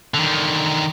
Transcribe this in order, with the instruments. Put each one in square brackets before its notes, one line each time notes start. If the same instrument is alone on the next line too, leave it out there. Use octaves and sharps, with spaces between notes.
[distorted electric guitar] D3 D#3